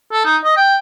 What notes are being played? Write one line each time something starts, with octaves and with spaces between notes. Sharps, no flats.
A4
D#4
D#5
G5